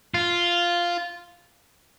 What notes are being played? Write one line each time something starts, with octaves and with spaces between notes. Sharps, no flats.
F4